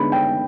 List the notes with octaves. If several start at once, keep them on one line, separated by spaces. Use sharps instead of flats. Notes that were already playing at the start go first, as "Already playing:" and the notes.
Already playing: D3 G#3 B3 D#4 B5
G5